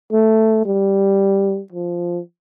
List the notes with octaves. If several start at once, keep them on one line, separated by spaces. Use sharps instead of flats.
A3
G3
F3